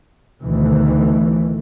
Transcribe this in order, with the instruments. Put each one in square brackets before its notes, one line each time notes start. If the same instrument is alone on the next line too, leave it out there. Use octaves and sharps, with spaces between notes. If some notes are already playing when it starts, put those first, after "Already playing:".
[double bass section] D2 B2 D#3 E3